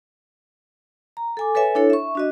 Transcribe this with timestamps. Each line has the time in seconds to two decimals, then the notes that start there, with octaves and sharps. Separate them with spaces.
1.17 A#5
1.37 A4 G#5 D6
1.55 A4 B4 C#5 E5 G#5
1.75 D4 E4 A4 C#5
1.90 E5 C#6
2.15 D4 F#4 D#5